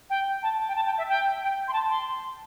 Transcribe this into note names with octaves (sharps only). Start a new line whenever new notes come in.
G5
A5
G5
A5
G5
E5
G5
G5
C6
A5
C6